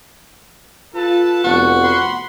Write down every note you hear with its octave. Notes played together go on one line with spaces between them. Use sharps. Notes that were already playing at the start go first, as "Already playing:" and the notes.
F4 A4 B4 A5
F1 B3 F#4
F#5 B5 C6